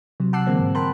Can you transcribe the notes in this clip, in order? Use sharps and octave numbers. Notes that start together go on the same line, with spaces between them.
C3 F#3
F#5 A5 D6 E6 F#6 C7
D3 E3 G#3 A#3 C4
G#2
A#4 G5 A5 B5 C6 F#6